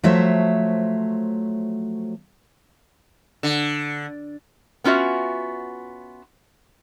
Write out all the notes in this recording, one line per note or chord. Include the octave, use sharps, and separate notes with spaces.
F3 F#3 A3 C5 C#5 E5
D3
B3 C#4 F4 F#4 E5